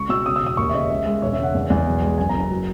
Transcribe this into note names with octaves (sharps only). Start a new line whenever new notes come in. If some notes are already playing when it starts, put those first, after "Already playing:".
Already playing: C#2 C#6
B2 E6
C#3 D#6
E6
E1
D#6
D#2 C#6
E5
C#3 D#5
C#2 E5
G#3
E1 C#5
E5
C#3 F#5
E2
E2
B1
G#3
F#1 G#5
A#5
F#1
A#5
F#3